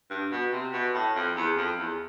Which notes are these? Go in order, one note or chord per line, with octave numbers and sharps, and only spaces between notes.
G2
B2
C3
B2
A2
F2
E2
F2
E2